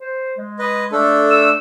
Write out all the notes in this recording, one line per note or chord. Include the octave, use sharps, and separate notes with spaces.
C5
G#3
B4 D#5
A3 D4 A4
E6